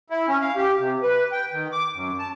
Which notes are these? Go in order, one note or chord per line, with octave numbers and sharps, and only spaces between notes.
E4
C#4
F5
G4
C3
B4
G5
D#3
D6
F#2
A5